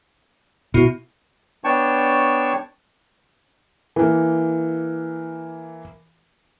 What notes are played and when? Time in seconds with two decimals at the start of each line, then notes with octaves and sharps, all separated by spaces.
0.74 B2 E4 F#4
1.64 B3 D4 C#5 G5 A5 C#6
3.96 E3 A#3